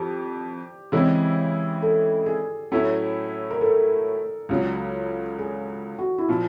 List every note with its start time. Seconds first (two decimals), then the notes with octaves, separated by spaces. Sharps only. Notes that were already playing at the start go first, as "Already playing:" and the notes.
Already playing: F2 F3 G4
0.92 C#3 E3 G#3 C4 E4
1.82 A4
2.26 G#4
2.72 A2 F#3 A3 C#4 E4
3.50 A#4
3.61 A4
4.49 C#2 C#3 F#3
5.39 G#4
5.99 F#4
6.18 E4
6.28 A#2 F3 F4